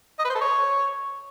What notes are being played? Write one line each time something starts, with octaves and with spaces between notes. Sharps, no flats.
D#5
B4
C5
A4
C#5